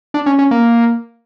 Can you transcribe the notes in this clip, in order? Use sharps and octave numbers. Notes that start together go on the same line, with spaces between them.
D4
C#4
C#4
A#3